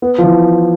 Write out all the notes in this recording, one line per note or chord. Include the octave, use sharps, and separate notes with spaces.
B3
F3
E3